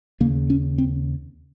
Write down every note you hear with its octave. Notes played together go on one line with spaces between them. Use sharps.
D#2 C#3 A#3
C#4
C4